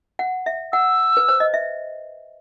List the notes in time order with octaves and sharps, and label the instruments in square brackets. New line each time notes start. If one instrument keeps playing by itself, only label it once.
[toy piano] F#5
E5
[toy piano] F#5 [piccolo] E6
[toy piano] B4
C5
D#5
E5